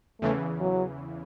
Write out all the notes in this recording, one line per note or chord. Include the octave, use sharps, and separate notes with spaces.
E2 C#3 E3 A3
F#3